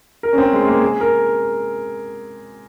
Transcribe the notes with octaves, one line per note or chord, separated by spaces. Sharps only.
A#4
C#4
C4
G#3
A#3
G#4
A#4